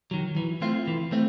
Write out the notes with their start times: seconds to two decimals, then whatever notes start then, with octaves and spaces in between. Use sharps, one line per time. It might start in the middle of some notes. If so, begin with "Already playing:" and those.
0.11 D#3 F#3
0.37 E3
0.62 A3 C4 F4
0.87 E3
1.12 A3 C4